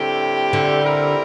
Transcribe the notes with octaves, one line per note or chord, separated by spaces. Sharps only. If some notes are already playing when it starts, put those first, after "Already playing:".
Already playing: A2 D3 G3 C4 G4
D3
G3 C4 E4 G4 A#4